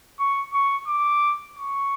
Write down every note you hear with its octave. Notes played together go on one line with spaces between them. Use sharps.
C#6
C#6
D6
C#6